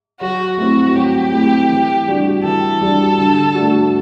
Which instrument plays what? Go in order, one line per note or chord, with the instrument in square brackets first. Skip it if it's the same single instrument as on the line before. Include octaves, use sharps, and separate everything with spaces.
[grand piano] F#3 [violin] F#4
[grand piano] A3 C4 E4 [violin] F#4
[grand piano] F#3 [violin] G4
[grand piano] A3 C4 E4
E3
G3 D4 F#4
[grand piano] E3 [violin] A4
[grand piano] G3 D4 F#4
D3
A3 D4 F#4